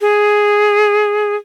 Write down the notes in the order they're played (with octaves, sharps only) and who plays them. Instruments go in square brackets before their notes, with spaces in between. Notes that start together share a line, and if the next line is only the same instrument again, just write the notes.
[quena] G#4